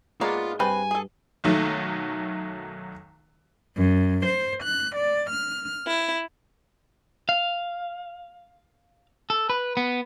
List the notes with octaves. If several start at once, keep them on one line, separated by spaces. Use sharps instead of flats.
G#2 G#3 A#3 B3 F4 F#4 D5
G2 C4 B4 G5 G#5
G#4 A4
B1 D#3 F#3 A3
F#2
C5
F#6
D5
F6
E4
F5
A4
B4
B3